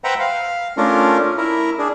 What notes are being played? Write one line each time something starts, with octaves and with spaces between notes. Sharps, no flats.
B4 C5 E5 F#5 G5 A#5
F5
A3 C#4 D4 F4 A#4
E4 A#4
D4 G#4